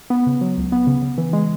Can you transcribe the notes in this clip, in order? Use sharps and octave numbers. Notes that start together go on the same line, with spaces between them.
B3
C#3
F#3
C#2
B3
C#3
C#3
E3
G#3